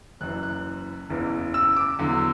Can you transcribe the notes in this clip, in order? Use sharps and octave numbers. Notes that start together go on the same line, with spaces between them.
F#1 F#2 E3 F#6
F#6
F#1 E2 C#3 E3
E6
D6
E2 D3 F#3